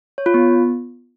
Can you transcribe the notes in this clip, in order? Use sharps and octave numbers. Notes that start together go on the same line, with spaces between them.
C#5
F4
B3